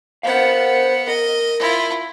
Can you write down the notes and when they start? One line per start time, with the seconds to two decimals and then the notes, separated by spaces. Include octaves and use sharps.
0.23 B3 A#4 C5 F5 F#5
1.08 A#4 D#5
1.59 E4 F4